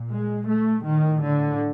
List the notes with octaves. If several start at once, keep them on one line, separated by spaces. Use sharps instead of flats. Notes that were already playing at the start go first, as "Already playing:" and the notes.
Already playing: A#2
G#3
A3
A2 D#3
D3